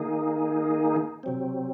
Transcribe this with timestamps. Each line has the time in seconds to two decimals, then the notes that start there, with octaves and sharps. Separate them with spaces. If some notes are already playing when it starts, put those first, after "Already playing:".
Already playing: D#3 A#3 D#4 G#4
1.23 C3 F#3 C4